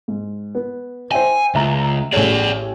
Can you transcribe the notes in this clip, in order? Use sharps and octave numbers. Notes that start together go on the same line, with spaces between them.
G#2
B3
C5 E5 G5 G#5
C#2 E5 A#5
A1 G#4 A4 C#5 D5